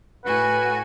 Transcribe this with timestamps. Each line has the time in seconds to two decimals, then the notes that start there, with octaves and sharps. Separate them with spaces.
0.25 A2 F#4 B4 F#5 G#5